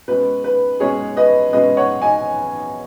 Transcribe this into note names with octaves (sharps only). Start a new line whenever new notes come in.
B2 G#3 C#4 B4
B4
B2 G#3 C#4 G#4 C#5
B4 D#5
B2 G#3 C#4 B4 D#5
C#5 F#5
D#5 G#5